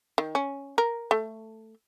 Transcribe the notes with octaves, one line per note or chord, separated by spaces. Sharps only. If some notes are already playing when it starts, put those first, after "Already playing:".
D#3
C#4
A#4
A3